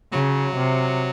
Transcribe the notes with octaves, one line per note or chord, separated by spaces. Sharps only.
C#3 F#3
C3